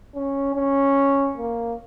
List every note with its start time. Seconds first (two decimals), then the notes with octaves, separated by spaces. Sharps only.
0.15 C#4
0.55 C#4
1.38 A#3